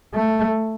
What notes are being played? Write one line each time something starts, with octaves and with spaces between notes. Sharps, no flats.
A3